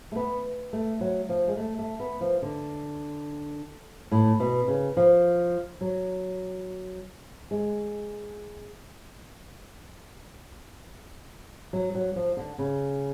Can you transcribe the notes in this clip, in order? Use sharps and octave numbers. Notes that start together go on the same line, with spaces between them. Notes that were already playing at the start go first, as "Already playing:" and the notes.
A3
B3
A3
F#3
F3
G#3
A3
A3
B3
F3
D3
A2
B2
C#3
F3
F#3
G#3
F#3
F#3
F3
D3
C#3